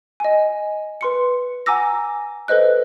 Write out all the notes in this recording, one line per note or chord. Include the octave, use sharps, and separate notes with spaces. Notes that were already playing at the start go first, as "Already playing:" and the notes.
D#5 G#5
B4 C6 C#7
F#5 G#5 A#5 D6 E6 A#6
A4 B4 C5 D#5 F#6